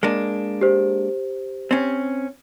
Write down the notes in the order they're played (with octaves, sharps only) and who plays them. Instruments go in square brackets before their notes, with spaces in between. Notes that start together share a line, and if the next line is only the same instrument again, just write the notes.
[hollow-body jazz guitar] G#3 A#3 D4
[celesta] G4 C5
[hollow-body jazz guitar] C4 C#4